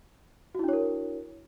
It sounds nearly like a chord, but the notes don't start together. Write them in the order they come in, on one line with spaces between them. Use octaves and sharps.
F#4 E4 D4 C#5 A#4